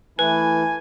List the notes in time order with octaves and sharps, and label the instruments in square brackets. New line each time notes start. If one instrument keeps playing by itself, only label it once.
[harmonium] E3 A3 E4 [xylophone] B4 [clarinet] G#5